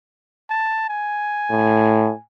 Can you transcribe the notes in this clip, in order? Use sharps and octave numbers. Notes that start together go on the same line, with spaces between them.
A5
G#5
A2